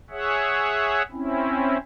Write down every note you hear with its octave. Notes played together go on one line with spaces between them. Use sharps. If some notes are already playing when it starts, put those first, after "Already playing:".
G#4 C#5 E5 F#5
C4 C#4 E4